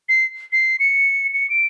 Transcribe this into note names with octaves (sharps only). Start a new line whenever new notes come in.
C7
C7
C#7
C#7
D7